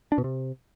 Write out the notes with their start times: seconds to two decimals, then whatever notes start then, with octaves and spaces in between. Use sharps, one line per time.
0.12 D4
0.18 B2
0.24 C3